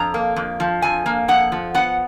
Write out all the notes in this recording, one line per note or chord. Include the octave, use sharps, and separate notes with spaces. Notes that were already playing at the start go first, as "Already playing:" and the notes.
Already playing: F2 A#5
A#3
F2
F3
F2 G#5
A#3
F2 F#5
F3
B3 F#5